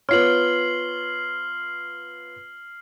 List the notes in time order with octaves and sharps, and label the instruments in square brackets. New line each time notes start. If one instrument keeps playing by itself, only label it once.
[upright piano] B3 F4 C#5 [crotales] F6 C7 F#7